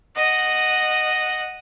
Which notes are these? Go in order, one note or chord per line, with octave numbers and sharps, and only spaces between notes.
D#5 F#5